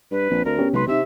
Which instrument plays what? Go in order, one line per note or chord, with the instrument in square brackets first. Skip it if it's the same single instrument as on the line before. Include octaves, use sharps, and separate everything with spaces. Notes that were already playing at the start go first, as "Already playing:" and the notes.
[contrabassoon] G2 [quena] B4
[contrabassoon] A#1 [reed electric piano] C4
[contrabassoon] D2 [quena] A#4
[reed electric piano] B3 C#4 G4
[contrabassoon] B1 [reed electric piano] C3 G#3 C6 [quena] B4
[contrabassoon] C3 [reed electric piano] C4 D#4 [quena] E5